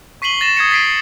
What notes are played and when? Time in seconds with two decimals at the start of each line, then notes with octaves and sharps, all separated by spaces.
0.22 C#6 B6 C7 D#7 F#7 G7
0.41 A6 A#6 E7
0.57 D#6 G#6 C7 C#7
0.71 A6 B6 C7 D7 D#7